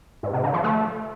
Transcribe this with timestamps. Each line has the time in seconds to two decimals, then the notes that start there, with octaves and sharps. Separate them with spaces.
0.23 G#2
0.33 C3
0.43 D3
0.54 F3
0.64 A3